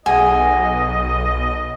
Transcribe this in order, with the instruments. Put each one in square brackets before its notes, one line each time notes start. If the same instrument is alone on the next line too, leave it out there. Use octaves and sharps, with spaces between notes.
[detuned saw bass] B1 [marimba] G#4 F#5 [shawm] D#5 [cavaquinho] G#5